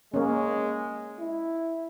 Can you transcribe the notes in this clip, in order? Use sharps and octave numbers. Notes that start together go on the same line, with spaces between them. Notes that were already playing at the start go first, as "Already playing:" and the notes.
G#3 A#3 C#4
E4